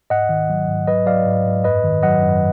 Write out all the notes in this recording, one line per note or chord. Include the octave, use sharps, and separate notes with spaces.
G#2 D#5 F#5
D#3
F#3
G#2
F#3 B4 D#5
F#3 D5 F5
G#2
G#2
F#2 B4 D#5
D#3
F#3 D#5 F#5
F#2